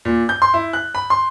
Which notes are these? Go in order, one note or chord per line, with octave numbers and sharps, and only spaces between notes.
A#2
G6
C6
E4
F#6
B5
C6